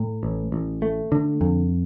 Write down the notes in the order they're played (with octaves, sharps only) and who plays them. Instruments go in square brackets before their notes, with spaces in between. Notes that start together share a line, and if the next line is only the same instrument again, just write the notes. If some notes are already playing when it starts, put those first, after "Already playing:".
Already playing: [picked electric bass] A2
A1
A1
A3
D3
F2